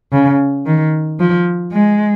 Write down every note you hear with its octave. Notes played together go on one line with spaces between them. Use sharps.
C#3
D#3
F3
G#3